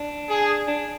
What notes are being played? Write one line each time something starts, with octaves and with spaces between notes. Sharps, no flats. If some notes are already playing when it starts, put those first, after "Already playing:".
Already playing: D4
G#4
D4